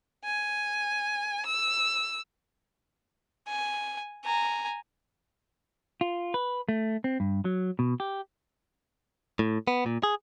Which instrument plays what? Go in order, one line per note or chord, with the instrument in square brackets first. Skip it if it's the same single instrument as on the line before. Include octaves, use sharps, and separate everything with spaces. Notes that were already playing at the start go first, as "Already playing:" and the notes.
[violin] G#5
E6
[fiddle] G#5
G#5 A#5
[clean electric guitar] F4
B4
A3
C4
G2
F#3
B2
G4
A2
B3
A#2
G#4